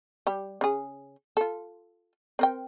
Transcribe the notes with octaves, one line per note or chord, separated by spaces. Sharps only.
G3 G4
C#3 G#4
F4 A4
C4 A#4 G5